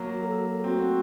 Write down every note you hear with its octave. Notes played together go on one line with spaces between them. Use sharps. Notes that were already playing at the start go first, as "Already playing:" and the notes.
Already playing: F#3 A#3
F#4
A#4
A4
A4
A3 C4 F#4